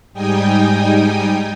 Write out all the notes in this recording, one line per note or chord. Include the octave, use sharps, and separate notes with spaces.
G#2 G3 D#4 G5 G#5 D#6